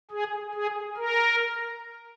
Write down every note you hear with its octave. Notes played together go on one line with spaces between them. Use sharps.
G#4
G#4
A#4